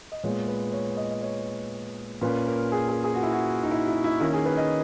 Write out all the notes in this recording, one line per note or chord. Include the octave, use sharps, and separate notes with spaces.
D#5
A#2 G#3 B3 C#5
B4
C#5
D#5
D#5
C#5
A#2 A#3 C#4 B4
A#4
G#4
G#4
G#4
F#4
E4
F#4
D#4
E4
E4
E4
D#3 A#3 C#4 E4
G#4
B4
D#5